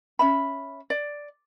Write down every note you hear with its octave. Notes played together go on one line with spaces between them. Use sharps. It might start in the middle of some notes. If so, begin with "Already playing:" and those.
C#4 E5 B5
D5